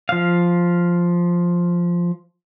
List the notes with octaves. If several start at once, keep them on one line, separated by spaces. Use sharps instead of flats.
F3 F5